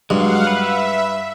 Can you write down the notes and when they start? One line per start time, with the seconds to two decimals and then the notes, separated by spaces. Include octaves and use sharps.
0.10 G2 F#3 G#3 F5 F#5
0.47 B4 E5